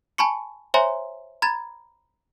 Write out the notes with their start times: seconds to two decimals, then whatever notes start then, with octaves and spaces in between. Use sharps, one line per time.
0.18 G#5 A5 B5 C#6 C#7
0.74 C5 C#5 E5 G#5 A#5 C6
1.42 A#5 B5 G#6 A6